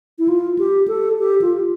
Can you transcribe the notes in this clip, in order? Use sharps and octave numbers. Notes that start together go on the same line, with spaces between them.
E4
F4
G4
A4
G4
F4